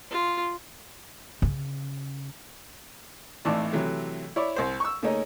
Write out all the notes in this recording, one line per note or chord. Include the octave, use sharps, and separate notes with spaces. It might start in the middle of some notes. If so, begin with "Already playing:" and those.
F4
C#3
G#1 A2 E3 D5 A5
C3 E3 F#3 A3
E4 C#5 D5
C2 C5
C#6 E6
C#3 A3 A#3 C#4 D#4